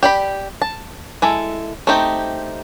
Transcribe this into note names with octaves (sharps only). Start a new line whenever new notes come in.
G4 D5 B5
A5
G#3 E4 A4
A3 C4 D#4 G4